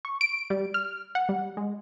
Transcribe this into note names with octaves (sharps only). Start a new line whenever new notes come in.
C#6
D7
G3
F6
F#5
G3
G#3